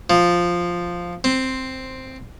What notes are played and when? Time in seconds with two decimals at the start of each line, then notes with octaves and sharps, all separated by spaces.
0.10 F3
1.24 C4